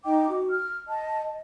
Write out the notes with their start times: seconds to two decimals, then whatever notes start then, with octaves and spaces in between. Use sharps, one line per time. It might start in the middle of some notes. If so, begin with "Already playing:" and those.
0.04 D#4 D#5 G5 D6
0.29 F#4
0.50 F6
0.88 D#5 A5